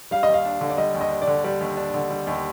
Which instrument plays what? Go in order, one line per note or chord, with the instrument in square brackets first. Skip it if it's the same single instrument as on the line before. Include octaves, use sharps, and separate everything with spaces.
[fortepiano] G3 [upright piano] F5
[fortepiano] D#2 [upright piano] D#5
[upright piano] F5
[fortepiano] D4
D3
[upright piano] D5
[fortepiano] G3 [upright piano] D#5
[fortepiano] D#2
[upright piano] D#5
[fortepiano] D4
[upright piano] D5
[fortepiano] D3
[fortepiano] G3 [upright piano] D5
[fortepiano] D#2
D4
D3
G3
D#2